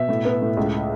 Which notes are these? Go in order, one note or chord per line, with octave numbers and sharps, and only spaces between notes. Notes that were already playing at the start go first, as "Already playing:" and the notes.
Already playing: B2 E5
A2
B3
A2
C#2